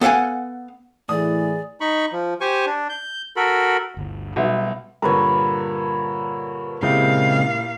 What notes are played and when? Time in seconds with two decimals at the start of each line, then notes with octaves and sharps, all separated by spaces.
0.01 B3 A4 F5 F#5 G#5
1.09 A2 E3 G#4 D5 D#6
1.81 D#4 B5 C#6
2.12 F3
2.41 G4 C5 G#5 C#6
2.66 D4
2.90 G6
3.36 F#4 A4 A#4 B5
3.97 G1 D2
4.36 B1 B2 G3 F#4 E5
5.02 G2 A#2 D3 A#4 B4 C#5
6.83 A#2 C#3 G#3 C4 E4 G4 F5